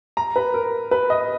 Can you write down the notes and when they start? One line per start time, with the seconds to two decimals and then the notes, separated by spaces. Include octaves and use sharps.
0.17 A#5
0.36 B4
0.54 A#4
0.91 B4
1.10 D#5